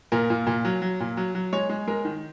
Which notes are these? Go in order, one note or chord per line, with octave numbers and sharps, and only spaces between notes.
A#2 A#4
A#2
A#2
F#3
F#3
A#2
F#3
F#3
G#3 C#5
G#3
G#3 A#4
D#3